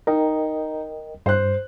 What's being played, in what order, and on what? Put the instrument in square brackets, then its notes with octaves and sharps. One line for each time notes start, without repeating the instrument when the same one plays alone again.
[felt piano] D#4 [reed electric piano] A#4 D#5 G5
[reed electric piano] G2 [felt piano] C5 F#6